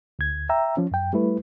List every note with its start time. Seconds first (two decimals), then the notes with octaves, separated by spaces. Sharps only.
0.19 D2 G#6
0.49 E5 G5 A#5 E6
0.77 F3 C#4
0.91 F#2 G5
1.13 G3 A3 E4 B4